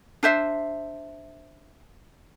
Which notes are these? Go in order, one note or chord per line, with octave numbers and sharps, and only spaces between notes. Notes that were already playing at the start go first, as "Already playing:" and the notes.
D4 C5 E5